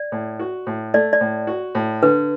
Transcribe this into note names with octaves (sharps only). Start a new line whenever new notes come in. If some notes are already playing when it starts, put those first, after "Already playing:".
Already playing: D5
A2
F#4
A2
A3 D5
D5
A2
F#4
A2
D3 B4